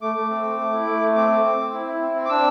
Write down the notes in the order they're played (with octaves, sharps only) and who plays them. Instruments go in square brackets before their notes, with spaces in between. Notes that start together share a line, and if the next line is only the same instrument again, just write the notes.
[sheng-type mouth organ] A3 D6
A3
C4
A3
A3
E4
A3
A3
C4 D6
C4
C4
C4
E4
E4
C4
C4
D6
D4 E6